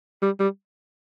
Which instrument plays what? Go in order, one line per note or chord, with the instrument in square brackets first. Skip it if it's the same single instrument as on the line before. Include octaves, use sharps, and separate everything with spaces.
[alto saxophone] G3
G3